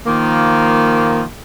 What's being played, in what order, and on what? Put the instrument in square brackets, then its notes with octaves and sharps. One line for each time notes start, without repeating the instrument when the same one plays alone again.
[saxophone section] D#3 F3 A#3